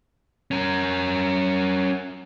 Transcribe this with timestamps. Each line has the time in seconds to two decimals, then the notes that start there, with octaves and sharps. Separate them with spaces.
0.51 C#4 A#4